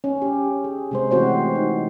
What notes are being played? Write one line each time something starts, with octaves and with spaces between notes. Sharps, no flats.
C#4
G4
G#4
C3 G#3 C5
E3 A3 C4 F#4 C5 C#5
D#4